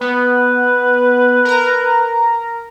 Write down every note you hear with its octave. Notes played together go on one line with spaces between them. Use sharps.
B3 B4
A#4 A#5